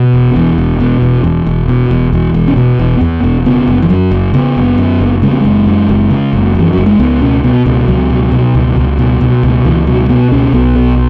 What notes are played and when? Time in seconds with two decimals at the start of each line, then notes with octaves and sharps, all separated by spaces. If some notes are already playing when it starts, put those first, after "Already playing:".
Already playing: B2 B3
0.14 E1
0.36 E2
0.58 E1
0.80 B2
1.02 E1
1.24 E2
1.47 E1
1.69 B2
1.91 E1
2.13 E2
2.34 E1
2.48 C#4
2.57 B2 B3
2.79 E1
3.01 E2
3.23 E1
3.46 C#3 B3
3.67 F#1
3.82 E3
3.89 F#2 F#3
4.11 F#1
4.34 C#3 B3
4.57 F#1
4.78 F#2
5.01 F#1
5.22 C#3 G#3
5.31 B3
5.41 F#1 G#3
5.67 F#2
5.89 F#1
6.11 C#3
6.33 F#1
6.55 F#2 E3
6.73 F#1 F#3
6.86 G#3
6.99 C#2 B3
7.21 B2 C#4
7.44 B2 B3
7.66 C#2 B3
7.88 C#2 F#3
8.10 B2
8.32 B2
8.55 C#2
8.76 C#2
8.99 B2
9.21 B2
9.43 C#2
9.65 C#2 E3
9.87 B2 F#3
10.09 B2 B3
10.32 C#2 C#4
10.53 B1 B3
10.75 B2